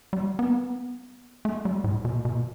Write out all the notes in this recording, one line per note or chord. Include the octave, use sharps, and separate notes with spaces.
G3
B3
A3
G3
A2
B2
B2